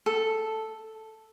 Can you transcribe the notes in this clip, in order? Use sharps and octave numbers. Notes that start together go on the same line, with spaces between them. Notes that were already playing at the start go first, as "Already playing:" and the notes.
A4